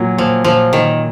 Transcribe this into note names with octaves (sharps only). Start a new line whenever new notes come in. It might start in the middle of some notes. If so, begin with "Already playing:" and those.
Already playing: A#2 F#3
A#2 F3
A#2 F3
A#2 D#3